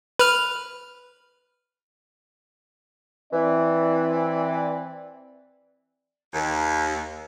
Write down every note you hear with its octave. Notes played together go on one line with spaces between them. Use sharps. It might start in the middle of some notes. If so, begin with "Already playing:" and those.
B4 F6
E3 C4 D5
D#2